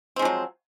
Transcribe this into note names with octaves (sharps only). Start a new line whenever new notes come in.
F3 F#3 G#3 C4